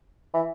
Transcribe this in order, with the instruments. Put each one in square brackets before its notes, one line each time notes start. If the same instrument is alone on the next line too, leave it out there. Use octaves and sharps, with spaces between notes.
[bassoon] E3